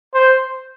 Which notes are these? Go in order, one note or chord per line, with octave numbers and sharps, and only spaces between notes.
C5